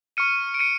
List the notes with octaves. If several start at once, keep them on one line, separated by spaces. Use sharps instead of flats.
C#6 F6 C#7 D#7
D7
C#7 D#7